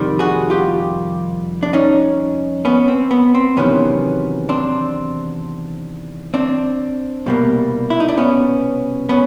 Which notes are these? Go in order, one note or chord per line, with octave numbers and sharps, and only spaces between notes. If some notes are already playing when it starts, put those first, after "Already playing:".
Already playing: F2 C3 D#3 G3
F#4 G#4
F4 G4
D4
C#4 D#4
B3 C#4
C4
B3
C4
E2 C3 D#3 F#3 B3 C#4
C4 D4
C4 D4
C2 B2 G3 A#3
E4
D#4
D4
B3 C#4
B3 C#4